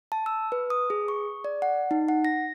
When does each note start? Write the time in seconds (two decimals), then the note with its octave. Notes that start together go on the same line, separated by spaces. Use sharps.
0.12 A5
0.26 E6
0.52 B4
0.70 D#6
0.90 G#4
1.08 C#6
1.44 D5
1.62 F#5
1.91 D#4
2.08 F#5
2.25 A#6